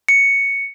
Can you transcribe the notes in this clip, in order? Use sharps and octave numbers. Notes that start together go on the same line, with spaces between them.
C#7